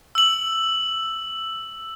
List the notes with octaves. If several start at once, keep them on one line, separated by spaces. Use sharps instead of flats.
E6 F#7